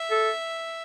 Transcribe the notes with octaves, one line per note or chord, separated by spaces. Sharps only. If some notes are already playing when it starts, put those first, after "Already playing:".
Already playing: E5
A4